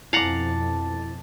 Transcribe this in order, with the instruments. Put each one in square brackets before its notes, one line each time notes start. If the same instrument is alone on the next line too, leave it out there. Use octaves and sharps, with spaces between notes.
[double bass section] F2 B2 [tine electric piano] E4 [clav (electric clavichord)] F5 F#5 A#5 [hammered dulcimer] A5 D6